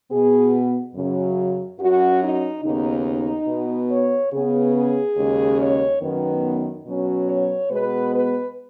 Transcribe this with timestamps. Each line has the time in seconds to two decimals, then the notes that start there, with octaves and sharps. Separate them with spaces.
0.10 B2 B3 G#4
0.94 F#2 C#3 F#3
1.79 F#2 F#3 C#4 F#4
2.21 D#4
2.63 D#2 C#3 B3 D#4
3.47 B2 B3
3.90 C#5
4.32 C#3 B3 G#4
4.74 G#4
5.17 D#2 C#3 G#3 C#4
5.59 C#5
6.01 F#2 D#3 B3
6.85 B2 F#3 C#4
7.28 C#5
7.70 B2 G#3 B3 B4
8.12 B4